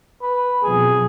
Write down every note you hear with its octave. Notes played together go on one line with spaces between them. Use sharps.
B4
B1 F2 G#4